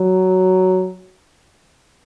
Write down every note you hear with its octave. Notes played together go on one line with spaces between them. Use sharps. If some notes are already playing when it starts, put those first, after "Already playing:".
Already playing: F#3